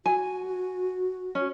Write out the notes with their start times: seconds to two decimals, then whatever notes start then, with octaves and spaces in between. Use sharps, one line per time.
0.06 F#4 G#5
1.35 C#4